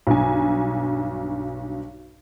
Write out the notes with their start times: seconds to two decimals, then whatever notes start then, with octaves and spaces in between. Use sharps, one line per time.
0.07 B1 G2 G#5